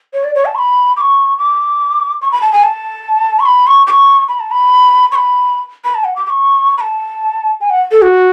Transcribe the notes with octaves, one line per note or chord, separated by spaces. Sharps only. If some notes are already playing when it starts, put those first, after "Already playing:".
C#5
D5
C#5
A5
C#6
B5
D6
C#6
D6
C#6
B5
A5
G#5
A5
C#6
B5
C#6
D6
C#6
B5
A5
B5
C#6
B5
B5
A5
F#5
D6
D6
C#6
B5
A5
G#5
F#5
A4
F#4